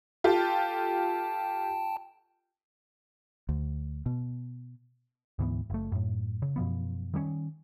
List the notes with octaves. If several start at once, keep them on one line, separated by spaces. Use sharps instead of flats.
F4 G4 A4 G5 A5
D2
B2
D2 G#2 E3 B3
F#1 A3
F#2 A2
C#3
F#2 B2 F3 B3
D#3 G3 A3 C#4